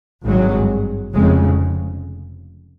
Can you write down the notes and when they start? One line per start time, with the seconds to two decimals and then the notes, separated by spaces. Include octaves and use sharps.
0.24 G#1 G2 F#3 G#3
1.14 F1 F2 C#3 F#3 G#3